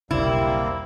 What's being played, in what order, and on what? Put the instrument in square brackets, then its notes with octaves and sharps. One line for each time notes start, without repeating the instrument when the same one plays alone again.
[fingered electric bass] E1 B1 C#3 [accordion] G3 A#3 C4 [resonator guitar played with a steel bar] E4